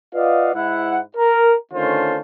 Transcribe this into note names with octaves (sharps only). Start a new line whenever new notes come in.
F4 B4 D5 D#5 F5 F#5
G#2 E4 F#5
A#4
D3 D#3 A3 C#4 F4 C5